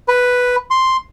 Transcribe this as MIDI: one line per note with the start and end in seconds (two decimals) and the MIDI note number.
0.08 0.56 71
0.71 0.97 84